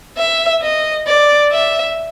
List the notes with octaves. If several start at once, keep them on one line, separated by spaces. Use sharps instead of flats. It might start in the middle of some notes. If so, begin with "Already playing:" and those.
E5
D#5
D5
E5